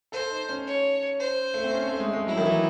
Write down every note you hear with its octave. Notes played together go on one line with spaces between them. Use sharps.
A4 C5
D#4
C#4
C#5
C5
A3
C4
C#4
A3
G#3
G#3
F#3 E4
D#3
E3